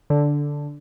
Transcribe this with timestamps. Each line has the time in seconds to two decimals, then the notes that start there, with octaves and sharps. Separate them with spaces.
0.10 D3